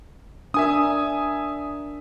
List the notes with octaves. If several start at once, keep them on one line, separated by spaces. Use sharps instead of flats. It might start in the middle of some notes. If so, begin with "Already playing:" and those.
D4 A#4 E5 G#5 D#6